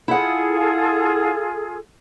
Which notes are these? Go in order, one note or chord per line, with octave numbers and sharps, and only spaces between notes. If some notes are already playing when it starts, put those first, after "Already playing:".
E4 F4 G#4 A4 F#5